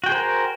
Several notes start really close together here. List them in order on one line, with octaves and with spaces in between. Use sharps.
F#4 G5 G#4 C5 A#4